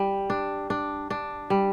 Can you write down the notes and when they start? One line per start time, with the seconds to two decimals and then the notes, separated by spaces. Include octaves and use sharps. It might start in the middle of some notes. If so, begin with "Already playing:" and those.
Already playing: G3
0.30 D4
0.70 D4
1.10 D4
1.50 G3